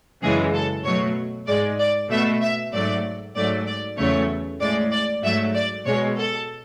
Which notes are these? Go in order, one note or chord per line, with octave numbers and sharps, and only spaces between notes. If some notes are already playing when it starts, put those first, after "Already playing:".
F#2 C#3 E3 G#3 G#4
A4
B2 F#3 A3 C#5
G#2 G#3 D5
D5
B2 A3 E5
E5
G#2 F#3 A3 D5
G#2 F#3 A3 D5
D5
E2 C#3 F#3 A3 C#5
A2 G#3 D5
D5
G#2 F#3 A3 E5
D5
B2 G#3 C#5
A4